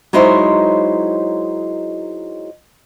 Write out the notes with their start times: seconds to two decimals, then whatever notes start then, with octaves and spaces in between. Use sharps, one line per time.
0.13 F#3 G#3 D#4 E4 C5 C#5